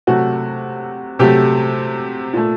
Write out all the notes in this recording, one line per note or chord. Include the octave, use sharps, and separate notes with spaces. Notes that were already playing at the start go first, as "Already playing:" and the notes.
C3 F#3 A3 F#4
C3 F#3 A3 G4
A#2 A3